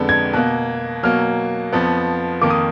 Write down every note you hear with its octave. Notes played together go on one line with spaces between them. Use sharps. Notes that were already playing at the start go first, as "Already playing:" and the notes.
Already playing: F2 D3 G#3 B3
G#6
B2 A#3 F#6
B2 F#3 A#3 F6
F2 F3 B3
F2 D#3 A#3 D6
D#6